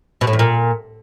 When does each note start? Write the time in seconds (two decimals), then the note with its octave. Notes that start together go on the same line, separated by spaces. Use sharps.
0.21 B2
0.27 A2
0.33 E2
0.39 A#2